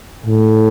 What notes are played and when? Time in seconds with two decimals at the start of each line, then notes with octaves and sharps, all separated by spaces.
0.26 A2